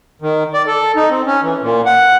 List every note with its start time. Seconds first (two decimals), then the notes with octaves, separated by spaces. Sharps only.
0.22 D#3
0.54 D5
0.67 A4
0.96 D#4
1.10 C4
1.27 C#4
1.43 E3
1.62 A#2
1.86 F#5